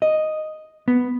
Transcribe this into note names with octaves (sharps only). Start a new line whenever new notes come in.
D#5
B3